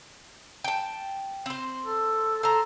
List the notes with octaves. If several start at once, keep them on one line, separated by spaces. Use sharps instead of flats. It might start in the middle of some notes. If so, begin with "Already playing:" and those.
G5 A5
C4 C5
A4
A4 C5 A#5